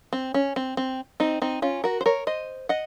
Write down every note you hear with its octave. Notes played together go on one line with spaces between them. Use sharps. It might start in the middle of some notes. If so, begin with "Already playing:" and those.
C4
C#4
C4
C4
C4 D#4
C4 D#4
C#4 F4
F#4 A#4
C5
A#4 C#5
C5 D#5
D#5 F#5